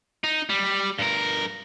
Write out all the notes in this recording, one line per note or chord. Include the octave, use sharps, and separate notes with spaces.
D#4
G3
G2 A#4